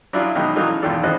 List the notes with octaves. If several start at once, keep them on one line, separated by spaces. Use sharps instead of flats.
F#3 D4 E4 F4 G#4 D5
B2 D#3 F#3 G#3 D#4
E3 F#3 A3 D#4 F4
C#4
B1 E2 D#3 F4 A4 D5
G#1 C#3 F3 D#5 F#6